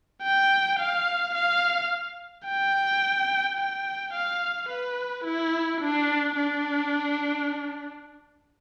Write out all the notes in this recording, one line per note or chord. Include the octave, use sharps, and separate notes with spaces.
G5
F5
F5
G5
G5
F5
B4
E4
D4
D4